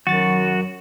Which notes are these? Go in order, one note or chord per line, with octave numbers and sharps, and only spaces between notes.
F#2 D#3 F#3 F#4 A6